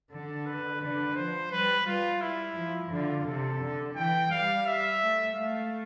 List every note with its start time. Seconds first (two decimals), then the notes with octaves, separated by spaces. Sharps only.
0.11 D3 A4
0.46 B4
0.81 D3 B4
1.16 F3 C5
1.51 G3 B4
1.86 G3 F4
2.21 E4
2.56 F3
2.91 D3 F4
3.26 C3 A4
3.61 D3
3.96 E3 G5
4.30 G3 F5
4.66 E5
5.01 A3
5.35 A3 F5